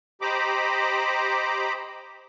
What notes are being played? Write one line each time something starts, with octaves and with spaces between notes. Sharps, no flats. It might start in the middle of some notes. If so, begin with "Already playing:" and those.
G4 C5 D#5 A#5 B5 D6